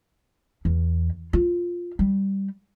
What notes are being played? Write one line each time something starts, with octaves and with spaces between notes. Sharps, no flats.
E2
F4
G3